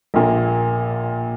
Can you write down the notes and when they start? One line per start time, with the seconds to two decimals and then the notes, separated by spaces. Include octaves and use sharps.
0.14 A#1 A#2 A#3